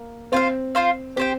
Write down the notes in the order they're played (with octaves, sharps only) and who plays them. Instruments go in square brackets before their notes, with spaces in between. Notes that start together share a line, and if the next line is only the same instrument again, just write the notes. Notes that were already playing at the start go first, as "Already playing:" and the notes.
Already playing: [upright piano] A#3
[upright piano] C4 [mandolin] F4 C5 F5
[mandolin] F4 C5 F5
[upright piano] C4 [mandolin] G4 C5 G5